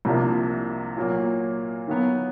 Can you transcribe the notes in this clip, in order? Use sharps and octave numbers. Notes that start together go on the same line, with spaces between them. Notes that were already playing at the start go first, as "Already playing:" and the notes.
C2 C3 F3 A#3 D4
A#2 F#3 A#3
D#3 F#3 B3